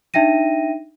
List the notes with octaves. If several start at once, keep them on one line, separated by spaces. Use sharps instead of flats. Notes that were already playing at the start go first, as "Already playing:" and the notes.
D4 D#4 E5 G5 A#6 D#7